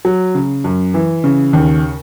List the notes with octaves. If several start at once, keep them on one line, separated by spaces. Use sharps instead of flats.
F#3
C#3
F#2
E3
C#3
D#2